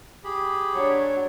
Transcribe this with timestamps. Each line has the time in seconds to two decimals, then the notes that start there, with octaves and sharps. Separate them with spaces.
0.24 G4 G#4 B5
0.74 F#3 D4 C#5